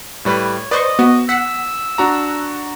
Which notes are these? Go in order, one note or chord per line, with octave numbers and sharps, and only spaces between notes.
A2 G3 B4 C#5
B4 C5 D5 D#5 C#6
B3 F#4
F#5 E6 B6
D4 F#4 A#5